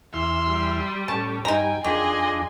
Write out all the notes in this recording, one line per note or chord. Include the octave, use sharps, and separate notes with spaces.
E2 E5 C6 E6 F6
G3
A2 C#4 G4 C#5 A5
G2 D#4 G5 G#5 A#5
F2 D#3 D4 G#4 D#5 G#5 C6